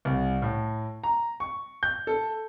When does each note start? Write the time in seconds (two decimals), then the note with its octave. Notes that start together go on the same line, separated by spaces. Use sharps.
0.05 C2
0.42 A2
1.04 A#5
1.40 C#6
1.83 G6
2.07 A4